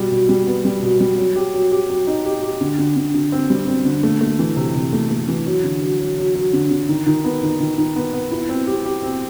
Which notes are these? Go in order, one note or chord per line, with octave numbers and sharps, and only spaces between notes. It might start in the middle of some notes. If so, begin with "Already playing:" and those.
Already playing: B2 G3
B2
G3
B3
G3
B2
G3
F#3
G4
F#3
G4
F#3
D#4
G4
G4
D3
D3
D3
D3
C4
G3
C4
D3
A3
A3
E3
C3
C3
A3
A3
E3
F#3
D3
F#3
F#3
F#3
F#3
D3
D3
D#3
D#3
B3
D#3
D#3
D#3
B3
B3
E4
C4
G4
G4
C4